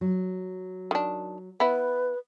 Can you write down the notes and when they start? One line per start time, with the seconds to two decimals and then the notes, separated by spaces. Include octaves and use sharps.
0.01 F#3
0.91 D#3 D4
1.60 B3 E4 B4